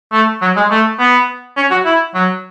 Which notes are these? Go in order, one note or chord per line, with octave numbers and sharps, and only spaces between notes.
A3
F#3
G#3
A3
B3
C#4
F#4
E4
F#3